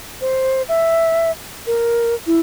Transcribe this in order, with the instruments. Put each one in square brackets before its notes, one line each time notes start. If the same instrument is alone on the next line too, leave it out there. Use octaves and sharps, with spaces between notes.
[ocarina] C5
E5
A#4
E4